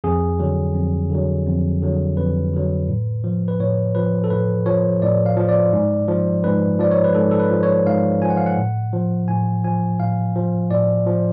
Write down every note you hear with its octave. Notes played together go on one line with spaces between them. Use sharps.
F2 G#4
D3 F#3
F2
D3 F#3
F2
D3 F#3
F2 B4
D3 F#3
A2
F3
B4
A2 C#5
F3 B4
A4
A2 B4
F3 C#5
A2 D5
F5
F3
D5
G#2
F3
G#2 B4
F3 D5
C#5
B4
G#2 A4
A4
B4
F3
C#5
G#2 F5
F3 G#5
F#5
F5
F#5
A2
F3
A2 G#5
F3 G#5
A2 F5
F3
A2 D5
F3